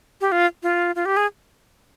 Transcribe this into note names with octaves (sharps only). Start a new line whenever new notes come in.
G4
F4
F4
F4
G4
G#4